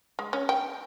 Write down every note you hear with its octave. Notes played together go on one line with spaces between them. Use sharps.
G#3
C#4
G5